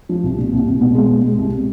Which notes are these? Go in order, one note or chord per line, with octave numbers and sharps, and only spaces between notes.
F3
C2
A#2
C2
C2
B2
G#3
B2
G#3
C2